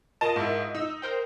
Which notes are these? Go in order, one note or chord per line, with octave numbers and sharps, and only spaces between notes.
F4 A#4 D#5 A5
G#2 E4
D#4 E6
A#4 C5 G5